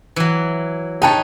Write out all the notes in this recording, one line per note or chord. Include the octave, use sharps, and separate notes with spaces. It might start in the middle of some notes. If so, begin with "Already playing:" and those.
E3 F#3
D#4 B4 C#5 G5 A5